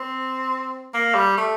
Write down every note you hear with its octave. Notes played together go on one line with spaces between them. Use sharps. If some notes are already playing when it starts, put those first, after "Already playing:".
Already playing: C4
A#3
G3
A3